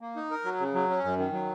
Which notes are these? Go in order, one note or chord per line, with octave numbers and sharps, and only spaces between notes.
A#3
D#4
A#4
F#3
C#3
F#3
C#4
F#2
D#3
F#3